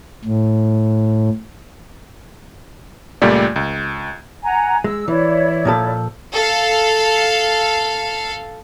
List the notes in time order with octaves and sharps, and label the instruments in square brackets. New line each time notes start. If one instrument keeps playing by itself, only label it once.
[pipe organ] A2
[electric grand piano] C#2 A#2 G3 A3 G4 D5
C#2
[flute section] F#5 G#5 A#5
[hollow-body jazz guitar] G#3 [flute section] E6
[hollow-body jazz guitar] E3 [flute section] E4 C#5 D5
[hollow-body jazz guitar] A#2 F3 A4
[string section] A4 F5